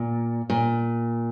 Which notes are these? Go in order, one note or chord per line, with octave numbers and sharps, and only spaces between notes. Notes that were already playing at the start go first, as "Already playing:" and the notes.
Already playing: A#2
A#2